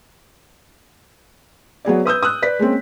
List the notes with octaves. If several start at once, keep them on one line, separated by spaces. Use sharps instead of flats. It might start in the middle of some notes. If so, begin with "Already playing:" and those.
F#3 B3 G#4 D5
B4 D#6 E6 G6
D#6 E6 F#6
B4 D5 B6
G#3 A#3 C4 C#4